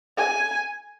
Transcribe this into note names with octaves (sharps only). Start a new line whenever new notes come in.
G#5